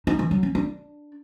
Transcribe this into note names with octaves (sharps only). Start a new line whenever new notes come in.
D#4
E3
F#3
C#4
D4